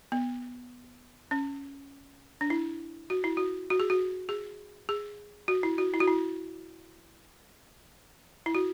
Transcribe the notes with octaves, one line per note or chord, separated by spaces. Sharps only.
B3
C#4
D4
E4
F#4
E4
F#4
F#4
G#4
F#4
G#4
G#4
F#4
E4
F#4
E4
F#4
E4
E4
F#4